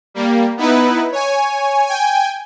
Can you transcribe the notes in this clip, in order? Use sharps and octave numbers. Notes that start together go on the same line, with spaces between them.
G3 A#3
B3 D#4 E4 B4
C#5 G#5
G5 G#5